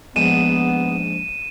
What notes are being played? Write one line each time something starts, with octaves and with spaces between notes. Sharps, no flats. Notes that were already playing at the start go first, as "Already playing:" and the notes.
A#1 G#2 B3 D#7 E7